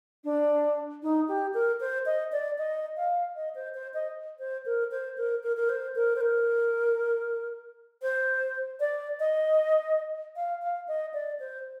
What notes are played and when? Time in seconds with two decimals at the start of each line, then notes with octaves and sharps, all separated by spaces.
0.24 D4
1.03 D#4
1.28 G4
1.54 A#4
1.80 C5
2.06 D#5
2.32 D5
2.58 D#5
2.97 F5
3.36 D#5
3.55 C5
3.74 C5
3.94 D#5
4.39 C5
4.66 A#4
4.91 C5
5.17 A#4
5.43 A#4
5.57 A#4
5.69 C5
5.95 A#4
6.16 C5
6.21 A#4
8.02 C5
8.80 D5
9.20 D#5
10.36 F5
10.62 F5
10.88 D#5
11.14 D5
11.40 C5